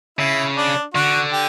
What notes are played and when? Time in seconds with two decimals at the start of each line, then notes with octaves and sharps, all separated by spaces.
0.19 C#3 E4
0.57 D4
0.94 D3 F#4
1.32 G4